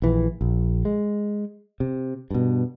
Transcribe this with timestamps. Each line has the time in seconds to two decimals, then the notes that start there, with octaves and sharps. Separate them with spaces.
0.02 A#1 E3
0.41 A#1
0.85 G#3
1.80 C3
2.30 G2 B2